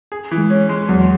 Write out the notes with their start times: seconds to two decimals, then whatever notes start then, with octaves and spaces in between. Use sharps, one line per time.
0.12 G#4
0.31 E3
0.38 G#3
0.50 C#4
0.69 G#3
0.89 E2 F#3